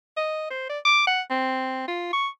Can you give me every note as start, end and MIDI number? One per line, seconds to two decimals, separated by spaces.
0.17 0.48 75
0.50 0.69 72
0.69 0.79 74
0.85 1.03 86
1.07 1.21 78
1.30 1.85 60
1.88 2.11 65
2.13 2.28 85